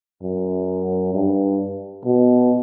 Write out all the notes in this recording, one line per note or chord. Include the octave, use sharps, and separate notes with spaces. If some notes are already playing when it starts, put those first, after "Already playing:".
F#2
G2
B2